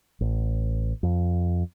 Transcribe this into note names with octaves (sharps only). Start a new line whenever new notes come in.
A1
F2